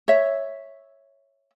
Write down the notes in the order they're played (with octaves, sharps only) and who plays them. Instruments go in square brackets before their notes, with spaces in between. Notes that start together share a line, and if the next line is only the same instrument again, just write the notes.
[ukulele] C#5 E5